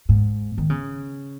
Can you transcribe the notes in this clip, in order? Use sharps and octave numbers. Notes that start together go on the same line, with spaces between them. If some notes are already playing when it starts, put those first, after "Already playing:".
G#2
D#3
C#3